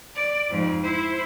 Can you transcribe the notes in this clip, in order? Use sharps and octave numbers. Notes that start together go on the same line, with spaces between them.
D5
F2 G#2
E4 C5